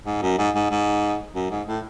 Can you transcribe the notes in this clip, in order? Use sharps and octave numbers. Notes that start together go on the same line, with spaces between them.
G#2
F#2
G#2
G#2
G#2
F#2
G#2
A2